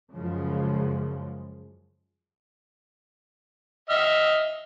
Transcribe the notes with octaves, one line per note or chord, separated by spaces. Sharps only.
F#2 C#3 F3 G#3
D#5 E5 F6